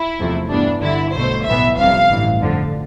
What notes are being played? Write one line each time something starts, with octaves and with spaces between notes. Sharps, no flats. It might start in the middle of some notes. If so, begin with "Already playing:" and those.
Already playing: E4
E2 C3 F3 A3
G2 E3 G3 B3 D4
G1 G2 D3 E4
B1 B2 A3 C5
B1 A2 E3 B3 E5
G1 F2 C3 F5
A1 G2 E3
F2 D3 F3